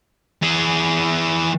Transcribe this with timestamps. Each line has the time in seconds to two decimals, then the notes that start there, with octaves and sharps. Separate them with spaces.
0.42 E3 G#4